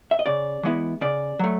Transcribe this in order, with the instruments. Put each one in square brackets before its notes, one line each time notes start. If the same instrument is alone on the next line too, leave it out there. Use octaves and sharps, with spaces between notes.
[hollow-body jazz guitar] E5
D#5
C#3 D5
E3 G#3 B3 E4
C#3 D5
F#3 A3